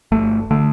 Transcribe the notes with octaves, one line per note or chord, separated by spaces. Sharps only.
G1 A3
D3 A3